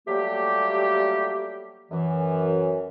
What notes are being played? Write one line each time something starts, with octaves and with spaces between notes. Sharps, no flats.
F#3 G3 A3 A#3 G4
F#2 E3